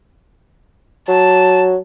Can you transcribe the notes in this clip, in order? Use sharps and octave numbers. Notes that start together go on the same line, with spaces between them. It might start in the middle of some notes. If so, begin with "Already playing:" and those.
F#3 A5